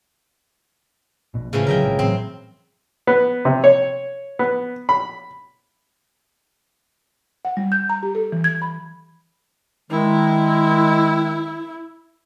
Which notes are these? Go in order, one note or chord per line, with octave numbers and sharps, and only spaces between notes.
A#1 B2
A2 C#3 E3 F3
B1 D3 F#3 A#4 E5 G5
A#1 G#2
A2 E3 F#3 C4
B3
C3
C#5
B3
B5
F#5
G3
G6
A#5
G4
A4
E3
G#6
B5
D#3 G#3 E4